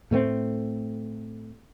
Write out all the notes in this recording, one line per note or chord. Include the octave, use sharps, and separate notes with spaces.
A2 A3 A#3 C4